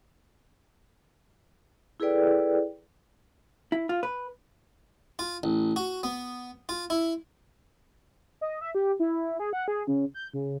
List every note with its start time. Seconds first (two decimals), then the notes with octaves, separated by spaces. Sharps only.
2.00 E4 G#4 A4 B4 D5 G5
3.72 E4
3.89 F4
4.03 B4
5.19 F4
5.43 A1
5.76 F#4
6.03 B3
6.69 F4
6.90 E4
8.41 D#5
8.61 E5
8.75 G4
9.00 E4
9.39 G#4
9.53 F#5
9.68 G#4
9.87 C#3
10.14 G6
10.34 C#3